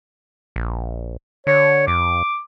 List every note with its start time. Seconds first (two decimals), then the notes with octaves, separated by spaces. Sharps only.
0.56 A#1
1.47 D3 C#5
1.87 F2 D6